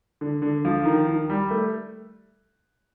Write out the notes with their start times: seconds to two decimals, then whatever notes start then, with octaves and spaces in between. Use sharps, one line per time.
0.21 D3
0.42 D3
0.65 F3
0.85 D#3
1.07 D#3
1.30 G3
1.51 A3